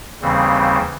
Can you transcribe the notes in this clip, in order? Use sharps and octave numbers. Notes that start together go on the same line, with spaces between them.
D#2 C#3 E3 G3 C4